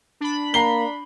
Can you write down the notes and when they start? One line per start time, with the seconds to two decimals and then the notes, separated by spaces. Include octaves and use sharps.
0.21 D4 B5
0.54 A#3 A#5 C7 G7